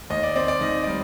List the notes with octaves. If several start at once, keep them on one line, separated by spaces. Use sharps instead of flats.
D#2 D#5
D5
C4 D5
D5
D#3 D#5
G3 D5